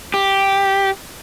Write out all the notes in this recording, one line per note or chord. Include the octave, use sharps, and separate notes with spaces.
G4